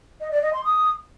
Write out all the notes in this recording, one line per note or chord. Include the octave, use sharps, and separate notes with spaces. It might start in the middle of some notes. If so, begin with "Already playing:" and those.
D#5
D5
D#5
C6
D#6